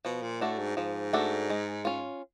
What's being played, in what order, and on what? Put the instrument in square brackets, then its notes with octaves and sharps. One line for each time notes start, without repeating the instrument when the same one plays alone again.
[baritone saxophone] B2 [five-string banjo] F3
[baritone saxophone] A#2
[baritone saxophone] A2 [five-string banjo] A3 D4 F#4 A4
[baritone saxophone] G#2
[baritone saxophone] G#2 [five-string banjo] F3
[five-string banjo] A3 D4 F#4 A4
G#3
C#4 F4